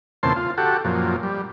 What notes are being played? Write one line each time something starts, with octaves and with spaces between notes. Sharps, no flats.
E2 A#2 C#3 C4 A5 C6
F4
F#4 G4 A4
F#2 A#2 F3
G3